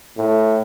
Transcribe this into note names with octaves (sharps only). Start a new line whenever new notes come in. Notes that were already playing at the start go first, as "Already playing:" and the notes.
A2